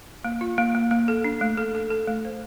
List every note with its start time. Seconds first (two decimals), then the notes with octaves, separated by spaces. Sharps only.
0.25 A#3
0.41 F4
0.58 A#3
0.75 A#3
0.91 A#3
1.08 A4
1.24 D4
1.41 A3
1.57 A4
1.75 A4
1.90 A4
2.07 A3
2.25 C5